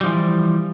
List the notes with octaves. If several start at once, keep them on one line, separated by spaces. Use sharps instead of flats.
E3 F3 G3